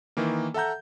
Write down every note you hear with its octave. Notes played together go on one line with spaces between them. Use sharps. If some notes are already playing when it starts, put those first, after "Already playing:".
D#3 E3 A#3
A4 E5 F#5 A#5 G6